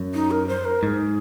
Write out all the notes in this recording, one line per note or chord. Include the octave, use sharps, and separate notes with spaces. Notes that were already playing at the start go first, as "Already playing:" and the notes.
Already playing: F#2
D#4
A#4
C5
A#4
G#2 G#4 A#4